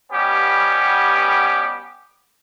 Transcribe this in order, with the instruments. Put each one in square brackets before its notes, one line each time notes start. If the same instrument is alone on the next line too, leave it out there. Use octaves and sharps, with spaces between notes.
[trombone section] B2 G3 B3 C#4 G4